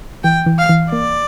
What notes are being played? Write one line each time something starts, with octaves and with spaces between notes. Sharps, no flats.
E3 G5
E3
F5
E3
A#3 D5